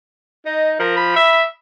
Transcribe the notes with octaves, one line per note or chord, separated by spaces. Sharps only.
D#4 D#5
F3 A#4
B5
E5